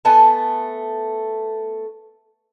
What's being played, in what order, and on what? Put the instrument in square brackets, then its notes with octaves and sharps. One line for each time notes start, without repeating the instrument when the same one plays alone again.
[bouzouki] A3 B3 G#5 A5